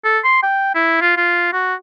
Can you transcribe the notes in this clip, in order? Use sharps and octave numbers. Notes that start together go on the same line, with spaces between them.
A4
C6
G5
E4
F4
F4
F#4